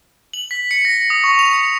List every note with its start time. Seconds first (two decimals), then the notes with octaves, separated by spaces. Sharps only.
0.34 F#7
0.51 B6
0.71 C#7
0.85 A#6
1.10 D#6
1.24 C#6
1.39 F7
1.53 C#7